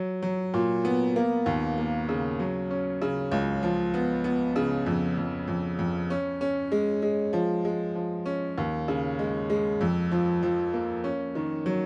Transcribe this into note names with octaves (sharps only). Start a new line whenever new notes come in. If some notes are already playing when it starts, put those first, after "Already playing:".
Already playing: F#3
F#3
A#2
B3
A#3
D#2
A#3
C#3
F#3
C#4
C#3
C#2
F3
B3
B3
C#3
F2
F2
F2
F2
C#4
C#4
G#3
G#3
F3
G#3
F3
C#4
D#2
C#3
G#3
G#3
F2
F3
F3
A#3
C#4
D#3
F#3